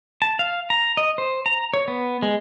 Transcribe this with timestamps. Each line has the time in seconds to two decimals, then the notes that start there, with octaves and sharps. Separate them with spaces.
0.22 A5
0.39 F5
0.70 A#5
0.97 D#5
1.18 C5
1.46 A#5
1.74 C#5
1.88 B3
2.22 G#3